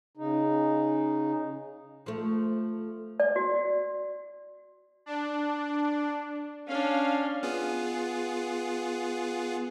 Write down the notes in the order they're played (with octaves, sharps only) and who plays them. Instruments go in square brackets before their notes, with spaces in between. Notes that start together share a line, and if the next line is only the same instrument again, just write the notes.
[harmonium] C#3 D#4
[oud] F3 A3
[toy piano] D5
F#4
[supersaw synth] D4
[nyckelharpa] C#4 D4 [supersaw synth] F5
[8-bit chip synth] B3 F4 G#4